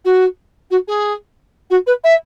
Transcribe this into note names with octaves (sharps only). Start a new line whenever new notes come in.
F#4
F#4
G#4
F#4
B4
E5